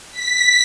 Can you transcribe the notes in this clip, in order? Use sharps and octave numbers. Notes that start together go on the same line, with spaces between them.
B6